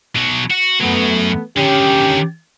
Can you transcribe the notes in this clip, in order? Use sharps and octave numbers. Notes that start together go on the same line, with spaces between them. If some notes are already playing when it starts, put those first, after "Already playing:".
B2 F#3
F#4
F#2 F#3 A3 B3
D3 D#3 C#4 G4